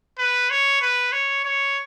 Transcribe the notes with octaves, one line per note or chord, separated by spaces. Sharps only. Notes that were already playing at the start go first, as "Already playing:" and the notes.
B4
C#5
B4
C#5
C#5